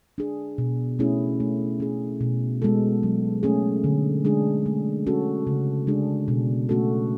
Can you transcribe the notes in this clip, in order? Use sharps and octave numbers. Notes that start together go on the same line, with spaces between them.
D4 G#4
B2
A3 C#4 E4 G#4
A3
C#4 G#4
B2
G#3 B3 F#4 A4
F#3
A3 C#4 G#4
D3
G#3 D4 G#4
A3
C#4 F#4 A4
C#3
G#3 D4 G#4
B2
A3 C#4 F#4 A4